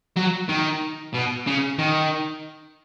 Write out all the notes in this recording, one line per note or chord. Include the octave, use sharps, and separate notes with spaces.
F#3
D#3
B2
C#3
D#3